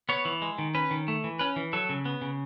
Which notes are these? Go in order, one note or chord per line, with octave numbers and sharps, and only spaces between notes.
B3 C#5
E3
G#3
D#3
C#4 B4
D#3
A3
E3
C#4 B4
E3
F#3 A4
C#3
B3
C#3